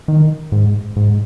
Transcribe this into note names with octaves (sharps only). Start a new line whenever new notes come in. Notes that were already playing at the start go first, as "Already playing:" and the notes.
D#3
G#2
G#2